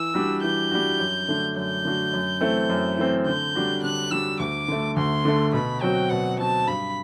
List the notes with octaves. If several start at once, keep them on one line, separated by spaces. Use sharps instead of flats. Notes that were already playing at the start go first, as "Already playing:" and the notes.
Already playing: E3 E6
G3 D4 F#4
E3 G6
G3 D4 F#4
F#2
D3 A3 D4 F#4
F#2 G6
D3 A3 D4 F#4
F#2
E3 A3 C4
F#2
E3 A3 C4
D3 G6
G3 D4 F#4
D3 F#6
G3 D4 F#4 E6
D2 D6
D3 A3
D2 C6
D3 A3
B2 B5
F#3 C4 F#4 G5
B2 F#5
F#3 C4 F#4 A5
G2 B5